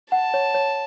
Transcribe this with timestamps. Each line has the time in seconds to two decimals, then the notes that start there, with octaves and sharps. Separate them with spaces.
0.12 F#5 A5
0.34 C#5
0.54 C#5